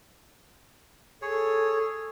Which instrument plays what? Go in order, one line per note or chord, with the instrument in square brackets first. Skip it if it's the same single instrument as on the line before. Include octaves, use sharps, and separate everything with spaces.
[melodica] G#4 C#5 [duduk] A4